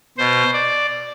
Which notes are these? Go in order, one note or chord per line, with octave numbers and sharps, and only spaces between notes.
B2 C5
D5